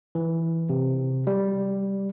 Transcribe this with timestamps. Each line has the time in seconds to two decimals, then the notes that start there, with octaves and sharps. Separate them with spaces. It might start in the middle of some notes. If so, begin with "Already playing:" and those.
0.15 E3
0.70 C3
1.27 G3